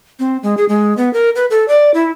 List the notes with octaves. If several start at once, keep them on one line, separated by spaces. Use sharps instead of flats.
C4
G#3
G#4
G#3
B3
A#4
B4
A4
D5
E4